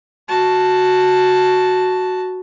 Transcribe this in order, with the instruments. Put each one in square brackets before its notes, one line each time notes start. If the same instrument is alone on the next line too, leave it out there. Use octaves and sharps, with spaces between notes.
[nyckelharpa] F#4 A5